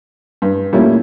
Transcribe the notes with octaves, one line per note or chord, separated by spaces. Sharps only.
G2
A#2 G3 A3 A#3 C#4 E4